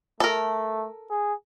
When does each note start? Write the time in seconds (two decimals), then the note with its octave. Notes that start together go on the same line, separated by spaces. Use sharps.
0.20 A3 A4 A#4
1.11 G#4